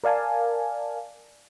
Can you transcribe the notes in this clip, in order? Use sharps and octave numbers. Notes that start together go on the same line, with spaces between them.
A#4 D5 F5 G#5 A5